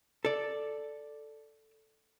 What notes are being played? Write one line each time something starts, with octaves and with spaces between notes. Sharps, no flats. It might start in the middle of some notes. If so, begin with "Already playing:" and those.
A4 D5